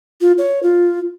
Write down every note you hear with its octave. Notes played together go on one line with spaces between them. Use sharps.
F4
C#5
F4